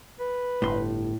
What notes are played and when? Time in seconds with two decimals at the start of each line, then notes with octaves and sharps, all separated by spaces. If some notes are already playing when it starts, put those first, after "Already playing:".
0.20 B4
0.62 G1 A2 C6